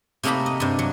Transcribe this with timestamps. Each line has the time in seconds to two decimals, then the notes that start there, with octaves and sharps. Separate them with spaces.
0.23 C3 A3 A#3 D#4 A#5 B5
0.46 D#5
0.60 G2 C3
0.79 F#3